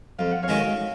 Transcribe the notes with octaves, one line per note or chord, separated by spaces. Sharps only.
F2 F5
F#5
C#5 F5
D#3 G#3 C#4 F#4